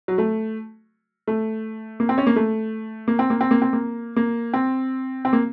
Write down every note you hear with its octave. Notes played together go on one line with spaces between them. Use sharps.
F#3
A3
A3
A#3
C4
C#4
A#3
A3
A#3
C4
A#3
C4
A#3
C4
A#3
A#3
C4
C4
A#3